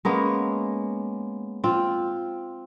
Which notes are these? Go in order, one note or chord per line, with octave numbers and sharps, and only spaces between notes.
G#3 A#3 B3 C#4
C4 F4